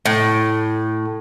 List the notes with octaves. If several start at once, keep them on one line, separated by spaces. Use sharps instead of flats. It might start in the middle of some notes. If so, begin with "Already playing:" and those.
A2